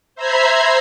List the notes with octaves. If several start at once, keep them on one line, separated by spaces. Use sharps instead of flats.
C5 E5 A#5 B5 G#6 C7